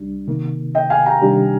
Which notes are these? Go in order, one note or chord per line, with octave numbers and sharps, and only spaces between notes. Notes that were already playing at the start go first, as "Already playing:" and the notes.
Already playing: C2 G3 D4
C3 D#3 A#3
D#5 G5
F5 G#5
G5 A#5
C3 D#3 G3 D4 G4